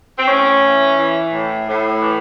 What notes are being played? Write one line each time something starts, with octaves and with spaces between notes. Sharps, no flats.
C4
A2 C#4
E3
E3
A2
A2
E3